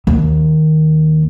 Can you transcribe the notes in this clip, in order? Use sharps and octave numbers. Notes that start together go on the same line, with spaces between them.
D#2